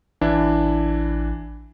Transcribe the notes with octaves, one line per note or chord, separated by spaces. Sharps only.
A1 E3 D4 E4